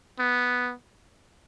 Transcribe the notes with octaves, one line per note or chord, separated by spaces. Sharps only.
B3